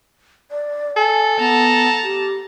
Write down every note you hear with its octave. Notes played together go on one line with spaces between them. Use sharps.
D5
A4 G#5
B3 A5 A#5
G4